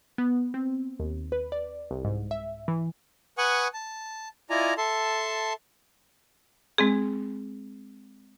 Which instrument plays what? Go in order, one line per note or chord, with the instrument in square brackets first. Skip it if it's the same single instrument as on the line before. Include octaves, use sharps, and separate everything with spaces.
[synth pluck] B3
C4
D#2
B4
D5
C2
G#2
E5
E3
[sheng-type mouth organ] B4 F#5 G#5 C#6 D#6 F#6
A5
E4 F4 D5 D#5 G#5 A#5
A4 E5 A5 C6
[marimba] G#3 C4 G#4